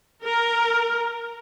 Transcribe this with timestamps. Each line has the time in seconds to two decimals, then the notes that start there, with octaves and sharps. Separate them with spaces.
0.24 A#4